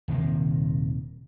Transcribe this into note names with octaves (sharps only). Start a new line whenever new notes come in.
D#1 C3 D#3 A#3